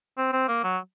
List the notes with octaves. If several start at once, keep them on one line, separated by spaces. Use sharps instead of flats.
C4
C4
A#3
F#3